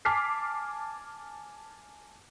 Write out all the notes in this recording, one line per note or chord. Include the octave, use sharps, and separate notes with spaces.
G#5 A5 D6 F6 B6 C7